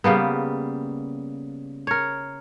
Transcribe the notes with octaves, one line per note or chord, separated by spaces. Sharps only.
C#3 G3 A#3 B3
A#4 C#5